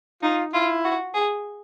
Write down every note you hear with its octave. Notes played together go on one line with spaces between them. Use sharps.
D#4 F4
E4 F4
F#4
G#4